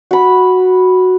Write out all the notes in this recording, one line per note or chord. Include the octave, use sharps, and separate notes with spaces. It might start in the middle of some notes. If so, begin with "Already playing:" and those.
F#4 B5